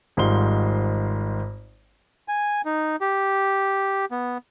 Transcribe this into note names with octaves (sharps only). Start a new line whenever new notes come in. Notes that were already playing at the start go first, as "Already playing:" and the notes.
G#1 G#2 G3 F4 C6 G7
G#5
D#4
G4
B3